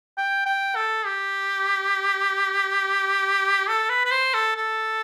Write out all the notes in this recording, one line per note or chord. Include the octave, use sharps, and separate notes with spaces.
G5
G5
A4
G4
A4
B4
B4
C5
A4
A4